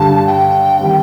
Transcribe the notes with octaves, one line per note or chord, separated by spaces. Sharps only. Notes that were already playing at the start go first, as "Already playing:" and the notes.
Already playing: G2 D3 G3 A5
G5
D#3 G3 C4